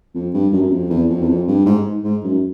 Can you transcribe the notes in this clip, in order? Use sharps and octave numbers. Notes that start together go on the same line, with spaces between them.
F2
G2
F#2
F#2
F2
E2
F2
E2
F2
G2
G#2
G#2
F#2